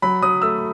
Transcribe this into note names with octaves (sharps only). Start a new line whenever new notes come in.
F#3 B5
F#3 D#6
A3 E6